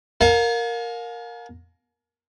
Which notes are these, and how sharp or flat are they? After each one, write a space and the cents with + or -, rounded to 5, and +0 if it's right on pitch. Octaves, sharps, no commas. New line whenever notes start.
A#4 -5 F5 +35 G#5 +45